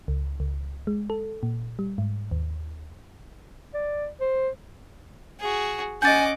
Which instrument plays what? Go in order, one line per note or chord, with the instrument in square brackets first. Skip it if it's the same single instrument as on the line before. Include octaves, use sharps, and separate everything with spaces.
[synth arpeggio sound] C#2
C#2
G#3
A4
A#2
G3
G#2
D#2
[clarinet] D5
C5
[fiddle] F#4 G#4
[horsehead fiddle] C#4 D#5 [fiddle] F#5 D6 [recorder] G#5 [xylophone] G6 A6